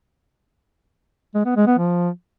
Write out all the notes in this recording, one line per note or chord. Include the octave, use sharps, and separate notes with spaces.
G#3
B3
G#3
B3
F3